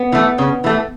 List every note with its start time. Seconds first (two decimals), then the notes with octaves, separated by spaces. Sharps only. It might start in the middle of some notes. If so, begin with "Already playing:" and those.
Already playing: B3
0.12 E3 A3
0.38 C#3
0.64 E3 A3